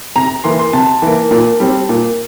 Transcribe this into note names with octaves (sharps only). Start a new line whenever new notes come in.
C3 A#5
E3 A#3 C6
C6
C3 A5
E3 A#3
A#2
G3 C4
A#2